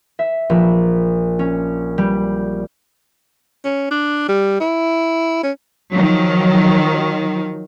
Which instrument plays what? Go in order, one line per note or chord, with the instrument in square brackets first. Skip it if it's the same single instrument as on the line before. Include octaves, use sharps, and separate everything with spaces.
[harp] E5
A#1
C#4
G3
[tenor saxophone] C#4
D4
G3
E4
C#4
[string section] D#3 F3 F#3